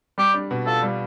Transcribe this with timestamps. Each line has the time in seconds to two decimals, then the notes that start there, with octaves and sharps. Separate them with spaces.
0.18 G3 G4
0.34 D4
0.51 B2
0.67 F4 A4
0.83 G3